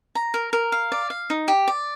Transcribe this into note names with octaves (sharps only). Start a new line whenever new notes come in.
A#5
A#4
A#4
F5
D5
F5
D#4
G4
D5